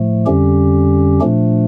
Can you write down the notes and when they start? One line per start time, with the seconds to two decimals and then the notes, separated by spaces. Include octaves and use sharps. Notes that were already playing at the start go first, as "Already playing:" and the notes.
Already playing: A2 F3 A3
0.26 F2 D3 G3 C#4 G4
1.20 A#2 F3 A3 D4